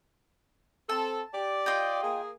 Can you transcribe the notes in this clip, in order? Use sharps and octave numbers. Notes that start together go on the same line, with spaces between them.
C4 A4 A5
G4 D5
F4 D#5 G5
A#3 G#4